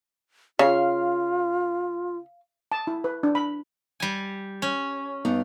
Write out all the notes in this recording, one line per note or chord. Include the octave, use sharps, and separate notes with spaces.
C#3 F4 F5
A5
E4
B4
D4
B5
G3 G#5
C#4
G2 B3 D#4